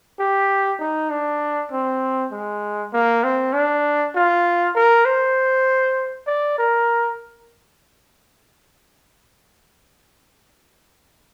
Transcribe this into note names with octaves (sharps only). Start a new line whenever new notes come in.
G4
D#4
D4
C4
G#3
A#3
C4
D4
F4
A#4
C5
D5
A#4